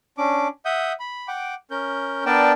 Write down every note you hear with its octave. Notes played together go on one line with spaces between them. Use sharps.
C#4 D4 D6
E5 F#5 D#6 G6
B5
F#5 G5 D6
C#4 A#4 G6
B3 D4 A#4 D5 G5 A5